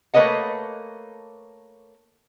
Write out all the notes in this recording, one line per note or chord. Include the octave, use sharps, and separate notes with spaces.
A3 A#3 B4 C#5 D#5 F#5